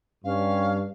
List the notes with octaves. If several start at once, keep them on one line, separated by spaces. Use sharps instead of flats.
G2 C#4 F5